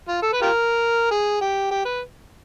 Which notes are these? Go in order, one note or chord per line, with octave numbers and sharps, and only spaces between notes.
F4
A4
B4
F4 G4 A#4
G#4
G4
G4
B4